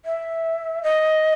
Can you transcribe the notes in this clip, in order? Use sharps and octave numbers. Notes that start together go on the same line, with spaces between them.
E5
D#5